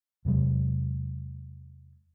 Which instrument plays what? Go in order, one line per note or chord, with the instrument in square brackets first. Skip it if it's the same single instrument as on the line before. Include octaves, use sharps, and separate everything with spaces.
[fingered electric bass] E2 C3 F#3 G#3